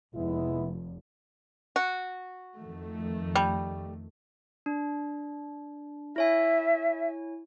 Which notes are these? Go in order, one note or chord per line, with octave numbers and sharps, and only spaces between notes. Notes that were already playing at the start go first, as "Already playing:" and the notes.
F1 G#3 B3 E4
F#4
F2 D#3 A3
G3
D4
E4 C#5 E5 G#5